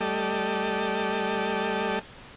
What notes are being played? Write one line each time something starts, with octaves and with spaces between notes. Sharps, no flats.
G3 A3 G4 A4 D5 D#5